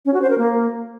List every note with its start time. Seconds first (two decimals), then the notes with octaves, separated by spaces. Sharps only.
0.06 C#4
0.14 F#4
0.22 C5
0.30 A#4
0.38 A#3